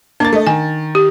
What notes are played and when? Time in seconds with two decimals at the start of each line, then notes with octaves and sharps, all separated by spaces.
0.20 A#3 D4 A6
0.33 A3 D#5
0.47 D#3 G#5
0.95 G4